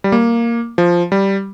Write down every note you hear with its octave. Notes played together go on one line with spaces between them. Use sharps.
G3
A#3
F3
G3